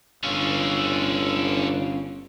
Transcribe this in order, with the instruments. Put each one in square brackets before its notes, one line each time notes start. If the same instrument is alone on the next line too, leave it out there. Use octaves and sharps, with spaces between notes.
[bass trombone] G1 [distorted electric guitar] D3 C#5 [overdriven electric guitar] C#4 F4